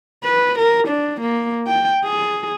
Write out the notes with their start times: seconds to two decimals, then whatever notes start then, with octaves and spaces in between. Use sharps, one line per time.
0.24 B4
0.59 A#4
0.88 D4
1.21 A#3
1.67 G5
2.04 G#4